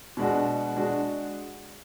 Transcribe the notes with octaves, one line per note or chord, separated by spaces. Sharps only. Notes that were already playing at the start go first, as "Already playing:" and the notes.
B2 G#3 D4 F#4
G#3 D4 F#4